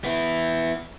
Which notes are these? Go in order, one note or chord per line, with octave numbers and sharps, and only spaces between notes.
B3 E4